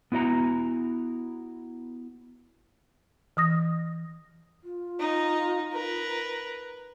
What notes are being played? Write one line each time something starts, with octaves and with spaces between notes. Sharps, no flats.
B3 E4 F#4 D#5 A#5
E3 D#6 A#6
F4
D#4
A#4 B4